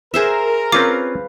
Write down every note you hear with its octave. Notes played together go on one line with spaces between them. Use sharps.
G#4 A#4 C5 E5
C4 C#4 F4 B4 F5 D6